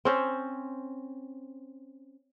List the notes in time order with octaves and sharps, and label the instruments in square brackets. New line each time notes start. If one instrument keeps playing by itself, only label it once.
[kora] C4 C#4 C5